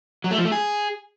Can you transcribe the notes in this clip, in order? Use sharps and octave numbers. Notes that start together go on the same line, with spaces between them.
F#3
A3
F3
A3
G#4